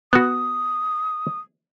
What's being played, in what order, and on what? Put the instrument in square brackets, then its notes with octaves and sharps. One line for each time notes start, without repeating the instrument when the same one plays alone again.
[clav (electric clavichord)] B3 F#4 [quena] D#6